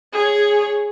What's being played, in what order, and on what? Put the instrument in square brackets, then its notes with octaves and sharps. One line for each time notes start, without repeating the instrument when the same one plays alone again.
[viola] G#4 C#5